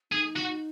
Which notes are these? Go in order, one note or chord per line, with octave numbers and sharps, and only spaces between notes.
D#4 G#4
F#4